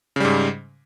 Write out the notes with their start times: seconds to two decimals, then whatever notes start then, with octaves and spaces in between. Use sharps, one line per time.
0.16 C#3
0.20 G3
0.25 G#2